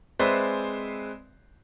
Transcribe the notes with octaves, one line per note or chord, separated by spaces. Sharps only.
G#3 C4 B4 C5 D5 E5